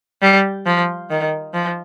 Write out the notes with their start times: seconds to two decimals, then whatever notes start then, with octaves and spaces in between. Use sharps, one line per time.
0.22 G3
0.66 F3
1.11 D#3
1.54 F3